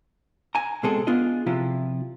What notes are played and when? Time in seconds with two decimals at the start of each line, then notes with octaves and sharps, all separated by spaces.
0.55 G#5 A#5
0.83 B2 G#3 C4 G#4 A4
1.07 B3 D4 F4 G#4 D#5
1.47 C3 F3 E4 F4